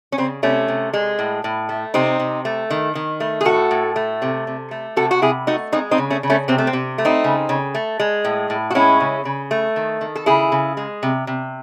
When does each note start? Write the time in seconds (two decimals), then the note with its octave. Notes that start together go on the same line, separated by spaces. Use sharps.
0.12 C#4
0.18 C#3 C4
0.43 C3 A3 C#4
0.68 C3
0.93 G#3
1.19 A2
1.44 A2
1.69 A3
1.94 C3 C4 D#4
2.19 C3
2.45 A3
2.70 D#3
2.95 D#3
3.20 A3
3.41 G#4
3.45 A2 F#4 A4
3.71 A2
3.96 A3
4.22 C3
4.47 C3
4.71 A3
4.96 C3 F#4 A4
5.11 F#4
5.22 C3 E4 G#4
5.47 A3 D#4 F#4
5.72 G#3 C4 D#4
5.91 C4 D#4
5.98 C#3
6.10 A3 C#4
6.23 C#3
6.30 A3 C#4
6.48 C3 C4
6.58 A3
6.67 C4
6.73 C3
6.98 A3
7.05 C4 D#4
7.24 C#3
7.49 C#3
7.75 A3
8.00 G#3
8.25 A2
8.50 A2
8.70 F#4
8.75 G#3 C#4 E4
9.00 C#3
9.25 C#3
9.51 A3
9.76 D#3
10.01 D#3
10.15 A4
10.26 C#3 E4 G#4
10.52 C#3
10.77 G#3
11.03 C3
11.27 C3